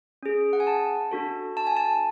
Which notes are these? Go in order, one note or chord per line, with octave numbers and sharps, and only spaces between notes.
C#4 G#4
F#5
G#5
A5
D4 F#4 A4
A5
G#5
A5